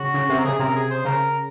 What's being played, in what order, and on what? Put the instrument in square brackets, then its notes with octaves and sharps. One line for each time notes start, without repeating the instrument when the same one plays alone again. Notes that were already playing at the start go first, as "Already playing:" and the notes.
Already playing: [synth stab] C#3 [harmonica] F#4
[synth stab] C#3
C3
[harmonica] A#4
[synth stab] C#3 [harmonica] G#4
[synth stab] C3 [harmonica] A#4
[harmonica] G#4
C5
[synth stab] C#3 [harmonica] A#4